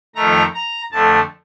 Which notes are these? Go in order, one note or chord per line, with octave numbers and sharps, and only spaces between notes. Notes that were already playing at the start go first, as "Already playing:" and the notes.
F2 D#3 A3 A#5
A#5
F2 D3 A3 A5